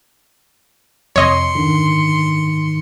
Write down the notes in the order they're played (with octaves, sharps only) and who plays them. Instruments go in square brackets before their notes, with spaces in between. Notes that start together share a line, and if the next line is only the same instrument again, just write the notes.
[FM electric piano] F2 C3 [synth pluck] C#5 D#5 [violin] C6 C#7
[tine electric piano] G#2 D#3 D#4 [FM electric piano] D3